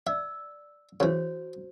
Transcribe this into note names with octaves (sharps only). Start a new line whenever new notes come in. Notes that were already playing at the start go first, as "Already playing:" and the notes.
D5 E5 E6
C#3 E3 F#4 C5 C#5